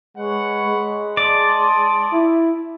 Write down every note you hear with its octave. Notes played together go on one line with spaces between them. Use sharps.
G#3 B4 C#5 F#5
G#3
D5 A5 C6 D#6
E4